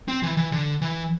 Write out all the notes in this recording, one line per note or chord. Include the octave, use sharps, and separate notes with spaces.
C4
E3
E3
D3
E3